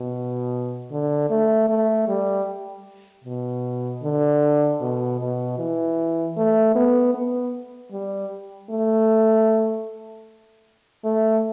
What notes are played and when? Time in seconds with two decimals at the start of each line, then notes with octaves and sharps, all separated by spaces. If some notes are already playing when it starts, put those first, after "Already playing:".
Already playing: B2
0.91 D3
1.30 A3
1.69 A3
2.08 G3
3.25 B2
4.03 D3
4.81 B2
5.20 B2
5.58 E3
6.37 A3
6.75 B3
7.14 B3
7.92 G3
8.70 A3
11.04 A3